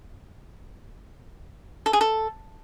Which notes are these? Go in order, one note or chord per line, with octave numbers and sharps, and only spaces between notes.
A4
G#4
A4